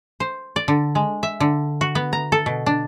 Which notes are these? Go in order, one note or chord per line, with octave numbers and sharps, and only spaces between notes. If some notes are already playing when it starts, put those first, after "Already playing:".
C5
D5
D3
G#3
E5
D3
F#4
B3
A#5
A4
B2
D4